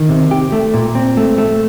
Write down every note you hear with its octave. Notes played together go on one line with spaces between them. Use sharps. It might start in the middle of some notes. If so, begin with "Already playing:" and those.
Already playing: D#3
C3
G4
A3
A#2
C4
A3
A3